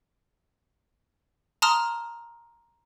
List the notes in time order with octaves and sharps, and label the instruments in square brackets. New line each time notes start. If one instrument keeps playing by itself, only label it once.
[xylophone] A5 A#5 C6 D#6 F6